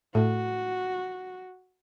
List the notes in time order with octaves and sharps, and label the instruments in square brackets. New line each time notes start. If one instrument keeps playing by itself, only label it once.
[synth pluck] A2 [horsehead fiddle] F#4